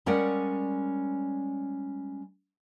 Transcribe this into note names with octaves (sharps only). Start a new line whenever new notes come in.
G3 G#3 C#4 A#4 D5 F#5